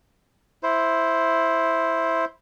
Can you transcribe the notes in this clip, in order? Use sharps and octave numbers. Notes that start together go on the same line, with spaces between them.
E4 C5